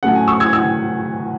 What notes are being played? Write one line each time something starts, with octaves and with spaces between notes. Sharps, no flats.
A2 F#3 A3 C#4 F#5
G#5
C#6 E6
E6 G#6
E6 G#6